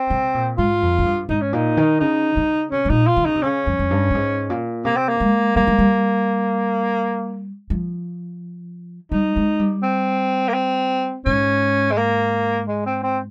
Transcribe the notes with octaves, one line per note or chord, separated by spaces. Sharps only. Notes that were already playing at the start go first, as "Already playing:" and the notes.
Already playing: C4
C3
A#2
G#2 F4
F2
G#2
G2
G#2 D#4
C#4
A#2 D#4
D#3
C#3 D#4
C#3
C3 C#4
C3
A#2 D#4
F4
D#3
C#3 D#4
C3
C#3 C#4
F2
F2
G2
G2
G#2
A#2
C3 A#3
C4
A#3
G#3
G3 A#3
G#3
G3
F3
G3 D#4
G#3
G3
C4
A#3
C4
G#2 C#4
G#3
A#3
G#3
C4
C4